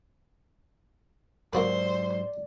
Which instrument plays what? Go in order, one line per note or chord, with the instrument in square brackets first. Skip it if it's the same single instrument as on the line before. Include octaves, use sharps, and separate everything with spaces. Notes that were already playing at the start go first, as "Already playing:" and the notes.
[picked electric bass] G#2 F#3 [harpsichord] A#3 F#4 B4 [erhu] C5 [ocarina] D5